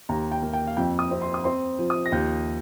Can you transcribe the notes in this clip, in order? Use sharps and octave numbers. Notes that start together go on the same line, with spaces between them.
D#2 A#5
G5
A#3
G5
F5
F2 G5
D#6
C4
C6
D#6
C4 C6
F3
D#6
A#6
D#2 G6